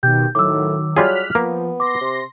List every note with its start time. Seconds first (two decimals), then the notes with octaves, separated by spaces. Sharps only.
0.03 B2 D#3 G4 G6
0.35 A2 D#3 F#3 D6 E6
0.97 F#3 G3 F4 G#4 F6 F#6 B6
1.35 F3 A#3 B3
1.80 C6 D6 A#6
2.01 C3